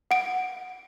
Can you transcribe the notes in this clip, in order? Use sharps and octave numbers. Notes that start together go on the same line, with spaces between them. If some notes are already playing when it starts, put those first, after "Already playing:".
F#5 D7